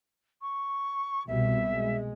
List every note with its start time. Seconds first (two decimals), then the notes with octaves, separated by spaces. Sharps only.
0.41 C#6
1.27 C2 B2 G3 E5
1.72 G#3